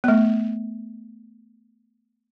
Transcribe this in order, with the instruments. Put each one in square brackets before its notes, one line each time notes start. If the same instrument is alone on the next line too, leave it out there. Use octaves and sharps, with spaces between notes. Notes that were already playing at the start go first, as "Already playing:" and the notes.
[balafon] A3 B3